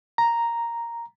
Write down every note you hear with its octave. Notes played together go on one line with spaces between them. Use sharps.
A#5